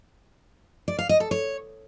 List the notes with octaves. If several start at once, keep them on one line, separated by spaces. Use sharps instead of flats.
D5
F5
D#5
A4
C#5